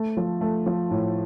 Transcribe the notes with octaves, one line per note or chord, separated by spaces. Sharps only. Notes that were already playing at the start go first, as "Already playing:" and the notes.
Already playing: A3
F3
A3
F3
A2